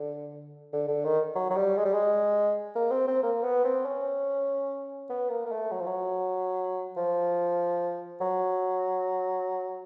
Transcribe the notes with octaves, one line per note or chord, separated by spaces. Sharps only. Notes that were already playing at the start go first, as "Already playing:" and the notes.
Already playing: D3
D3
D3
D#3
F#3
F#3
G3
G#3
G3
G#3
A#3
C4
C4
A#3
B3
C4
C#4
B3
A#3
A#3
A3
F#3
F3
F#3
F3
F#3